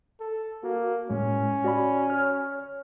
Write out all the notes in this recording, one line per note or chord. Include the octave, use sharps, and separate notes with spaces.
A4
A#3 F#4
A2 G#3 C#4
F#4 D5 B5
C#5 F6